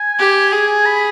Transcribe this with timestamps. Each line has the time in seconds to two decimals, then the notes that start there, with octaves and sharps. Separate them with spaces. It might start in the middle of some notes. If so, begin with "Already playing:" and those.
Already playing: G#5
0.19 G4
0.52 G#4
0.86 B5